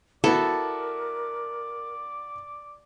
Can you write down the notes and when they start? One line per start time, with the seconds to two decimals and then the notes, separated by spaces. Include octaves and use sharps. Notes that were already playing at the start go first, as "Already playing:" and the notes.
0.24 B3 E4 F#4 A4 A#4 D5